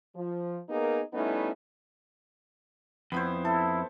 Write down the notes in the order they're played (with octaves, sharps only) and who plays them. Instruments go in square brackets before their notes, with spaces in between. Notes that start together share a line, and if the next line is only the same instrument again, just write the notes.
[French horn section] F3
A#3 B3 D#4 G#4 A#4
G3 A3 B3 C#4 D#4 E4
[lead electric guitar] F2 [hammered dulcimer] B3 E4 C5
[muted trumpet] E4 [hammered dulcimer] A4